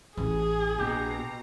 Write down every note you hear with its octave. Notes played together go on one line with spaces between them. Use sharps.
A1 E3 G#4
A#1 B2 G4 A#5